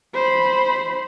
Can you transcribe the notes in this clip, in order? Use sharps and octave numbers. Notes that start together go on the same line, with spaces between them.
C5 B5